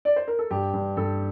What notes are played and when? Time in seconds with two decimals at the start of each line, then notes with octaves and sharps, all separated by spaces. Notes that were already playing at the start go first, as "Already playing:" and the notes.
0.05 D5
0.16 C5
0.28 A#4
0.39 A4
0.51 G2 G4
0.74 G2
0.97 G2 A4